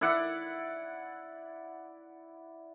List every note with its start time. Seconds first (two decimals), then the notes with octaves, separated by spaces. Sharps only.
0.01 E4 D5 F#5